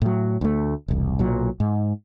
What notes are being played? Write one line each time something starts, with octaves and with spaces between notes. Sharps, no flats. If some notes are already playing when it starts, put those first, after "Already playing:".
A2 F#3
D2 A3
E1 C2
B1 A#2 F#3
G#2